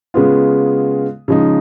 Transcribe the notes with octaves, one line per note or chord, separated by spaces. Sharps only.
C#3 G#3 B3 F4
C#3 F3 G#3 D#4